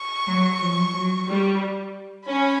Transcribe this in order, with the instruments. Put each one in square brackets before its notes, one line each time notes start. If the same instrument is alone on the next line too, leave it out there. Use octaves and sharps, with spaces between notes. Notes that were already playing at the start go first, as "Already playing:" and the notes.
Already playing: [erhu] C#6
[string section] F#3
F3
F#3
G3
[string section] C#4 [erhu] B5